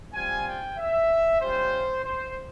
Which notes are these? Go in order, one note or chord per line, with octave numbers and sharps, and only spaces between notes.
G3 C4 F4 G#5
G5
E5
G3 C#4 F4 C5
C5